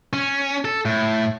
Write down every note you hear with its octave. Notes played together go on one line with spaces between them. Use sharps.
C#4
A4
A2